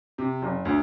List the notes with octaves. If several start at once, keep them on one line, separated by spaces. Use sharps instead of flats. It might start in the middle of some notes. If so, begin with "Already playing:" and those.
C3
F#1
D2